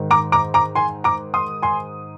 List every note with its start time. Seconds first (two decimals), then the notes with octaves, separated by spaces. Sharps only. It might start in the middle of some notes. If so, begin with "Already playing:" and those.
Already playing: G#2 D#3
0.11 A#5 D6
0.32 A#5 D6
0.54 A#5 D6
0.75 G#5 C6
1.04 A#5 D6
1.34 C6 D#6
1.62 G#5 C6